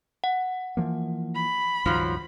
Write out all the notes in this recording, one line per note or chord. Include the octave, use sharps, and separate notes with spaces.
F#5
E3 F3 A#3
B5
C#2 G2 D#3 F3 F#3